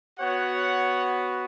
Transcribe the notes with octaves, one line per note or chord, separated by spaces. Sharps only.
B3 F#4 C#5 F#5